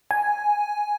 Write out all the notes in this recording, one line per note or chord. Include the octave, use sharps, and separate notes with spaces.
G#5